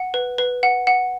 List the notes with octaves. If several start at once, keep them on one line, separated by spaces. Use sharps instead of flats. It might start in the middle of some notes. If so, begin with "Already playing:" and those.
Already playing: F#5
B4
B4
F#5
F#5